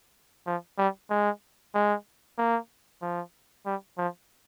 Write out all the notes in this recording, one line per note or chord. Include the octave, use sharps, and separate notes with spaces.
F3
G3
G#3
G#3
A#3
F3
G3
F3